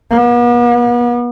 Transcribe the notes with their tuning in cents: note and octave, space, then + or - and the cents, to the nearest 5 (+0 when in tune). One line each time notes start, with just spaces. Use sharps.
B3 -45